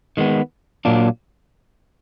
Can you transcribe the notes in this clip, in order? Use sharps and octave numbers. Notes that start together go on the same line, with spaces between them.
D#3 G#3 B3
A#2 F#3 A#3 D4 F4